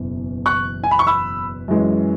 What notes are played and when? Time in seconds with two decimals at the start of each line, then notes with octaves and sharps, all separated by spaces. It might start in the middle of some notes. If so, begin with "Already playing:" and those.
Already playing: F#1 E2 B2
0.46 C#6 F#6
0.84 G#5
0.91 B5
0.99 C#6
1.07 B5 E6
1.68 F#2 E3 G#3 C#4